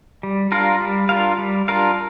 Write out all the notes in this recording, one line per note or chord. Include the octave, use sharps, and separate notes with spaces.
G3
D4 F4 A#4 F5
G3
D4 F4 A#4 F5
G3
D4 F4 A#4 F5